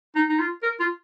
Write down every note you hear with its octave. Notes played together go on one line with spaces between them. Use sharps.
D#4
D#4
F4
A#4
F4